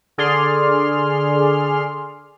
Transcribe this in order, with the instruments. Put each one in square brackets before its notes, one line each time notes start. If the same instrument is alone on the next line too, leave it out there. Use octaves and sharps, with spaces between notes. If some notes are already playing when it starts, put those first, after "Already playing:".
[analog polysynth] D3 G#4 D5 C6 F6